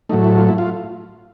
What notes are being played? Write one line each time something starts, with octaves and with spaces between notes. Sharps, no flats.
A2 F#3 A3 D#4
E4
F4
E4
F4